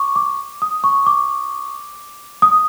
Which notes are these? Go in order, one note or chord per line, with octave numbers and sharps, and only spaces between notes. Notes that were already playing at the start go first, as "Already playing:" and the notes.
Already playing: C#6 D6
D6
D#6
C#6
D6
D#6